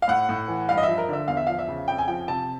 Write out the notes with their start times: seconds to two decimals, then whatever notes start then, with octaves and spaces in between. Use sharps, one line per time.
0.02 F5
0.08 A2 F#5
0.29 A2
0.48 E3
0.69 G2 F5
0.77 D#5
0.83 F3 E5
0.98 A#4
1.09 D3 E5
1.28 E2 F5
1.37 E5
1.47 F3 F5
1.59 E5
1.68 C#3
1.88 F2 G5
1.98 G#5
2.08 F3 G5
2.28 C3 A5